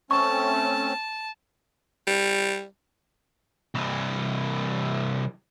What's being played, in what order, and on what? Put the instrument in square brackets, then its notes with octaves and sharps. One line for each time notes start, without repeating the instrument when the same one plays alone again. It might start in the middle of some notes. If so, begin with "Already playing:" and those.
[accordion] A3 C4 C#4 [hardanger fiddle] A5 [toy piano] C#6
[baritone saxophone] G3
[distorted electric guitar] C2 E3